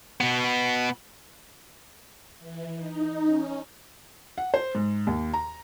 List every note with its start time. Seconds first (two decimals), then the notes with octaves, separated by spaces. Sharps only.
0.21 B2 B3
2.39 E3
2.76 D#4
3.26 C#4
4.38 F#5
4.54 C5
4.75 G#2
5.07 D#2
5.34 A#5